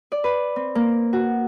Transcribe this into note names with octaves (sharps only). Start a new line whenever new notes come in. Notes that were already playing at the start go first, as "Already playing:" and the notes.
D5
B4
C4
A#3
F#4